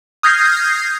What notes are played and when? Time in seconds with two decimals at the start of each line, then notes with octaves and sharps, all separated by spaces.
0.23 D#6 F6 G6 G#6 A#6 C7